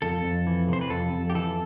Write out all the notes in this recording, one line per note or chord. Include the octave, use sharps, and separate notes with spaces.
F2 A4
F2
E3
C3 C5
B4
F2 A4
F2
G4
E3 A4